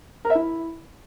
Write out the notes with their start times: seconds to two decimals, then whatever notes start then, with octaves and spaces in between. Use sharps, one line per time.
0.25 A#4
0.30 E5
0.35 E4